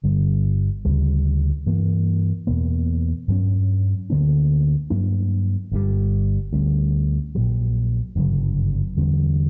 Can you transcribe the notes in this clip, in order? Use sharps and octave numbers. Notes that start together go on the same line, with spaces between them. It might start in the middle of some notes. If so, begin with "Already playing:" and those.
G1 G2 D3 G3
D2 C#3 G3
G2 E3 A#3
E2 B2 A#3
G2 F#3 C#4
D2 D3 A#3 C#4
G2 F#3 A#3 D4
G1 G2 D3 G3
D2 D3 G3 C#4
A#1 A#2 F#3
G1 F#2 C#3 F#3
E2 D3 G3 C#4